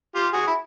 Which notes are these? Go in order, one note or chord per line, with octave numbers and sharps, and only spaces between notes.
F4 G4
F#4 G#4
E4